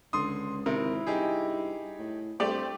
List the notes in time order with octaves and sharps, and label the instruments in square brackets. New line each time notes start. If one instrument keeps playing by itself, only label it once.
[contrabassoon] C#2 [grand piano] D3 C6 D#6
[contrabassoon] G#1 [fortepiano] C3 [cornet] E4 [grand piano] A#4
[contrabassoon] G2 [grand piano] D#4 G4 G#4
[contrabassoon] A2
[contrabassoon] G2 [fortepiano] A3 G4 D5 [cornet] C4